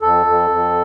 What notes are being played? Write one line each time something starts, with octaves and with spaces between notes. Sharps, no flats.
F2 A4
F2
F2